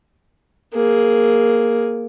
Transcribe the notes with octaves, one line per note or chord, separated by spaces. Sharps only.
A#3 G#4